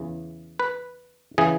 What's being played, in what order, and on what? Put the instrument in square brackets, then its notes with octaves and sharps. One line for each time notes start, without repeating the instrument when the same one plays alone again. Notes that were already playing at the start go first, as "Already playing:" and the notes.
Already playing: [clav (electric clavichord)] E2 C#3 E3
B4
C#3 E3 G#4